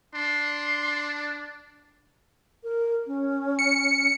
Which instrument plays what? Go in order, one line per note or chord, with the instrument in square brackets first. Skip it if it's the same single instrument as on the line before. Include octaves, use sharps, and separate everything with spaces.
[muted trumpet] D4 [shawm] C6
[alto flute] A#4
C#4
[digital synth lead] C#7